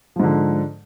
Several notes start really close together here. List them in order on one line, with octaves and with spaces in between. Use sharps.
F3 G#2 D3